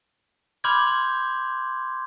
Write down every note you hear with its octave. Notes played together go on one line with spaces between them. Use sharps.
B5 C6 D6 F6 G6 G#6